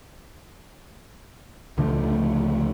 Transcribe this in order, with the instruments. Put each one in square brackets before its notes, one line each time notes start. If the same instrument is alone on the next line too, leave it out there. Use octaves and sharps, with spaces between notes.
[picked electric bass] C#2 D3 F3 A3